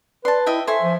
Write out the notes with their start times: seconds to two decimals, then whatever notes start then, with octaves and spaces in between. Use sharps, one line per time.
0.25 B4 D5 A5 C6
0.46 E4 D#5 E5 G5
0.67 A4 C5 E5 G#5 C#6
0.82 F3